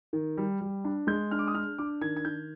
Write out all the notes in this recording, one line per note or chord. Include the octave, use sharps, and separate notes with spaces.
D#3
G3
G3
D4
G#3 G6
D4 F6
D6
D#6
D4 F6
D4 D6
D#3 G#6
G#6
D#3 G6